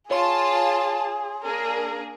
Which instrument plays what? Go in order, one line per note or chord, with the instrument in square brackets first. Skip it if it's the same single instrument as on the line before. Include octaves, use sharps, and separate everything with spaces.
[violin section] F4 A5 [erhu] G#4 [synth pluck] C#5 C6
[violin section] A#3 D4 G#4 [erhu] A#4